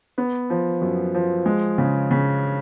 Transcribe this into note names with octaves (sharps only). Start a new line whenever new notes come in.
B3
F3
F#2
F3
G#3
C#3
C#3